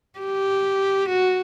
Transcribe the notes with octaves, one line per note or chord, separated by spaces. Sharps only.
G4
F#4